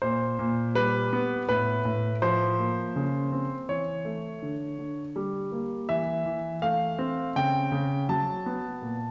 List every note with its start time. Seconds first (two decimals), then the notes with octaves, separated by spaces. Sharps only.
0.02 A#2 C5
0.39 A#2
0.75 G3 B4
1.13 B3
1.49 A2 B4
1.85 A2
2.22 F3 C5
2.59 A#3
2.96 C#3
3.32 C4
3.69 E3 C#5
4.05 A3
4.42 D3
4.79 D3
5.16 G3
5.52 A#3
5.89 E3 E5
6.26 E3
6.62 A3 F5
6.99 C4
7.36 C#3 G5
7.72 C#3
8.09 F#3 A5
8.46 B3
8.82 A#2